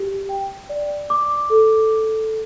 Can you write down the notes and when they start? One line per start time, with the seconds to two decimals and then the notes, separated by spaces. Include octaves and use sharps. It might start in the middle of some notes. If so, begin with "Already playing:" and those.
Already playing: G4
0.29 G5
0.69 D5
1.10 D6
1.50 A4